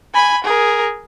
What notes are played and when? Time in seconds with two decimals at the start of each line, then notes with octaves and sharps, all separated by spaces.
0.14 G#5 B5
0.44 G#4 A#4